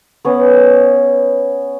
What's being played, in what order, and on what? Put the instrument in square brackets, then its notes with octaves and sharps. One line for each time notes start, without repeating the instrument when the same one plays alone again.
[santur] B3 C#4